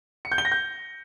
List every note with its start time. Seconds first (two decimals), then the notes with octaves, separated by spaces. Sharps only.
0.25 C#7
0.32 G6
0.38 G7
0.45 A#6
0.52 G6